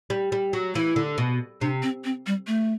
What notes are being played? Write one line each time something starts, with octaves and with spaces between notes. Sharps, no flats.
G3
G3
F#3
E3 E4
D3
B2
C3 D4
C4
C4
G3
A3